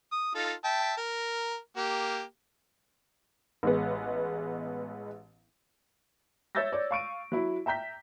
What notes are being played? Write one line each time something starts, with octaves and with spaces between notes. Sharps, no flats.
D#6
D#4 F4 A4
E5 G5 A5
A#4
A#3 G4
A1 G#3 B3
C#5 E5 E6 G6 A6 A#6
C#5 D5
F5 C#6 D7 D#7
F#3 E4
E5 G5 A#5 G6 B6